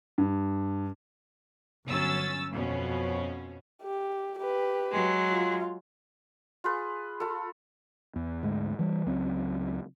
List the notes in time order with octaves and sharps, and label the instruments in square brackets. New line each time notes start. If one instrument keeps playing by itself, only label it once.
[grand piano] G2
[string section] G1 F#3 C#4 E6 A6
F2 B2 C#4
[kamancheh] G4
G4 B4
[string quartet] F#3 G#3
[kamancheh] F4
[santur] F4 G#4 B4
F4 A4
[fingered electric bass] E2
D2 G#2 G#3
E3 G3
C#2 F#3 C4